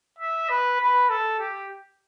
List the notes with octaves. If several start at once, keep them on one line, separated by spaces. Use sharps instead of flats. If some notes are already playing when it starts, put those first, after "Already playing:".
E5
B4
B4
A4
G4